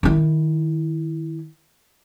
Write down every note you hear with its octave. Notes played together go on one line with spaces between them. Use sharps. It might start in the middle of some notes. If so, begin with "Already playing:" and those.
D#3 E4